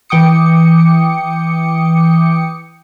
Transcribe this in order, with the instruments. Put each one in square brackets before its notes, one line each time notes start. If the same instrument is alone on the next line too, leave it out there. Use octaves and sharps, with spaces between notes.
[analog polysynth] E3 G5 D6 D#6 C#7